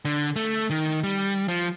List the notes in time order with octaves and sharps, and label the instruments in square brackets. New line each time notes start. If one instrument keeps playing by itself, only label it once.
[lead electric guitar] D3
A3
D#3
G3
F3